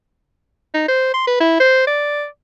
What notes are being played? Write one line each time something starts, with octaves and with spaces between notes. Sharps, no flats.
D#4
C5
C6
B4
E4
C5
D5